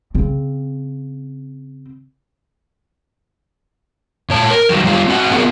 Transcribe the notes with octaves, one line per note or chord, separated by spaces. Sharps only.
C#3 C4
A#2 C#5 A5
A#4
D#3 F#3 G3
G3 F4 G4
C4 F#4 F#5
B3 F4 F#4 G#4 A#4